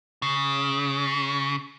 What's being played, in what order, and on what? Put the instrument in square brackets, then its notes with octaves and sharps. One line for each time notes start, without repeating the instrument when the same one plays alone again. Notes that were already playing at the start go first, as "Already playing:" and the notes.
[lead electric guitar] C#3